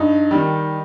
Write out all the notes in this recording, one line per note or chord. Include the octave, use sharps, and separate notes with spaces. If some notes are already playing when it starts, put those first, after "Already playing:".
Already playing: G2 D#4
D#3 G3